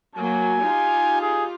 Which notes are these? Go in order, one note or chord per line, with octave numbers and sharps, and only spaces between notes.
F#3 A#3 G#5
D#4 F4 G4
G#4